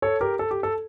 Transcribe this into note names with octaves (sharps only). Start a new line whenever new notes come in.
A4 C#5
G4 A#4
A4
G4
A4